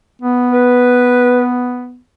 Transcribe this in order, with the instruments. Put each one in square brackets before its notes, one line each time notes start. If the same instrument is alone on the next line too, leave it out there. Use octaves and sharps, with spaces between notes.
[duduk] B3
[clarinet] B4